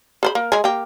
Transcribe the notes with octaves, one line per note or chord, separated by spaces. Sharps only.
G#4 C5 B5
A#3
G#3 G#4
A#3 G4